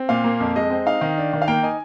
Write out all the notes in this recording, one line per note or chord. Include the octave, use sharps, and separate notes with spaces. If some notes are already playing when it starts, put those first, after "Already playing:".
Already playing: C4
A#2 F5
A#3
F2
G#3 D#5
C4
D#4 F5
D#3
D4
D#3
F5
A#3 G5
D#4 G#5